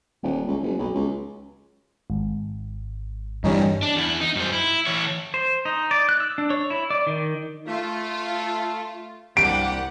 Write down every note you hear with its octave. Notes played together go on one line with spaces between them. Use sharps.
D#1
C#2
F#1
B1
C#2
G#1
G2 E3 G3 C#4 D#4
D4
E2 E4
D#4
F#2 C5
E4
E3 C#5
C5
D#4
D5
F#6
E6
D4
C#5
E4
D5
D#3
A3 F4
C2 A#3 D4 G4 F#5 D7